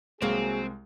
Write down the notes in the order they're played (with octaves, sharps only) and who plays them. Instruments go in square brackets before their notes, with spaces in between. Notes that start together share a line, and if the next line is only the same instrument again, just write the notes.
[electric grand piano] C2 G#3 [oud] F#3 A#3 [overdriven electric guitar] C4 [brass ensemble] G#4